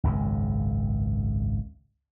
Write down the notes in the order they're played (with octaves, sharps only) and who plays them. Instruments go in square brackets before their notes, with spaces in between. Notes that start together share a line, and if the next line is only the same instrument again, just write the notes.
[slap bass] G#1 C#2 F#2